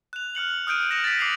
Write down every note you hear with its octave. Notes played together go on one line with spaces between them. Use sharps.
F#6 F7
F6 F#6 C#7 F#7
D#6 F6 G6 D7 D#7
F6 A#6 C#7 E7 F7
A6 B6
D6 C7 F7 F#7